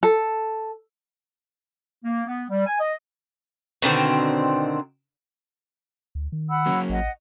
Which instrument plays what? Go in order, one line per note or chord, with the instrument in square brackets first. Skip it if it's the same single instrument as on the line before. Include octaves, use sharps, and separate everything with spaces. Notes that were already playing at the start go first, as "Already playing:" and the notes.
[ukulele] A4
[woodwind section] A#3
B3
G3
G#5
D#5
[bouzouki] B2 D3 D#3 C4
[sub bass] D2
D#3
[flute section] F#5 B5 E6
[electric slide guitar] F#3 A#3 C#4
[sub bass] A1 [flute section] D#5 F#5